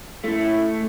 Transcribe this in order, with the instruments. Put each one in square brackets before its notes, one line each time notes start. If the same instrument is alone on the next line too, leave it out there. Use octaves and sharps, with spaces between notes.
[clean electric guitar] A3 [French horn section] C#4 E4